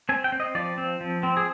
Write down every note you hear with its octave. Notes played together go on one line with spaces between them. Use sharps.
C4 G#5
G5
C4
D#5
F3 D5
C4
F3
C4
G#4